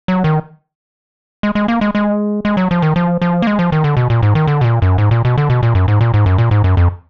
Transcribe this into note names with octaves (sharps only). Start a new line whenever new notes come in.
F#3
D#3
G#3
G#3
A#3
G#3
G#3
G#3
F#3
F3
D#3
F3
F3
A#3
G#3
F3
D#3
D3
B2
A#2
G#2
D#3
D3
B2
A#2
F#2
G#2
A#2
B2
D3
B2
A#2
F#2
G#2
A#2
G#2
F#2
A#2
G#2
F#2
F2